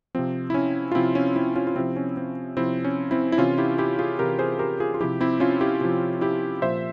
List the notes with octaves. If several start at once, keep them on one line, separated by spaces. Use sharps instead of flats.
C3 F3 C4
E4
C#4
F4
C3 F3 C4 E4
C#4
C4 E4
C#4 F4
F4
C3 F3 C4 E4
C#4
C4
C3 F3 C4 E4
C#4
C4 E4
E4
C3 E3 C#4 F4
E4 G4
E4 G4
F4 G#4
C3 E3 G4 A#4
G#4 C5
G4 A#4
F4 G#4
F4
C3 F3 E4 G4
C4 E4
C#4 F4
E4 G4
C3 F3
E4 G4
A#2 F3 C5 E5